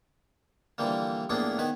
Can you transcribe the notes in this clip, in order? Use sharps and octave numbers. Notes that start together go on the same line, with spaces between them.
D3 E3 F3 G3 A#3
A2 F3 A#3 B3 D4 G#4
D#3 B3 B4 G#5